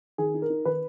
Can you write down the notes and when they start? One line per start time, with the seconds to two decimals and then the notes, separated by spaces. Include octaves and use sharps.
0.18 D#3 G#4
0.34 D#4
0.42 A#4
0.50 D#4
0.65 D#3 B4